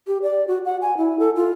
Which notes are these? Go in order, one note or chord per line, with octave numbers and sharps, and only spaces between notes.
G4
D5
F#4
F#5
G#5
E4
A4
F4